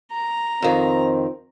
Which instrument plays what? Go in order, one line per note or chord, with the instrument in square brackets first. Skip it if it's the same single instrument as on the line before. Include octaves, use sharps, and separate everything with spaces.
[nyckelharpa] A#5
[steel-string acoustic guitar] F2 D#3 [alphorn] C4